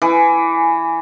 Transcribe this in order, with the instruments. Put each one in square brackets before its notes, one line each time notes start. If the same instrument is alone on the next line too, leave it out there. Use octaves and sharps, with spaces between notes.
[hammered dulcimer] E3